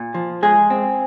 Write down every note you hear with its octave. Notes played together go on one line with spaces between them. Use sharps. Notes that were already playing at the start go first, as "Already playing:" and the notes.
Already playing: A#2
F3
G#3 G#4
C4